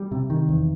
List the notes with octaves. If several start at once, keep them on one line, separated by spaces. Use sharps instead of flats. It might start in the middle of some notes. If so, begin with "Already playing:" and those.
Already playing: G3
C3
D#3
E2